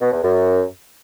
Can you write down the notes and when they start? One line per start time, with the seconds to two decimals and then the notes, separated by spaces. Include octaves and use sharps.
0.01 B2
0.12 E2
0.23 F#2